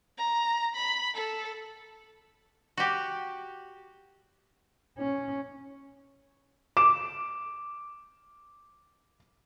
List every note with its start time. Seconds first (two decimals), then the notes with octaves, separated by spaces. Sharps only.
0.18 A#5
0.76 B5
1.15 A4
2.77 F#4 G4
4.98 C#4
6.77 D6 E7